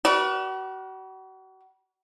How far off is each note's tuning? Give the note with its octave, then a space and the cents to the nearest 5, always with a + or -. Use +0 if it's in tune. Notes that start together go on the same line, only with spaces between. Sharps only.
F#4 +40 B4 -35 D5 +0